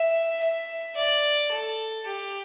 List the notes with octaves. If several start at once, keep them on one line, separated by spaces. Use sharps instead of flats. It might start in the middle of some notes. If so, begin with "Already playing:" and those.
Already playing: E5
E5
D5
A4
G4